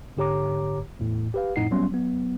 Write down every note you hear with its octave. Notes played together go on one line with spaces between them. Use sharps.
G#2 D3 G4 C#5 A#5 D6
E2 A2
G4 B4 F5
G#1 F2 A2 D#4 F#5 C7
F#3 G3 B3 C#4 C6
F#3 B3